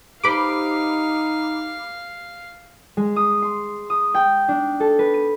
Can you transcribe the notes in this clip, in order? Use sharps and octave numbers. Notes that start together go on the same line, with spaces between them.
D#4 G4 B4 C5 F5 B5 D6
G#3
D#6
C6
D#6
G5
D4
A4
B4
D#7